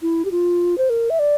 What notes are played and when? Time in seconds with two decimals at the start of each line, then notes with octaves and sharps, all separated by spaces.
0.02 E4
0.25 G4
0.31 F4
0.78 C5
0.90 A#4
1.10 E5
1.19 D5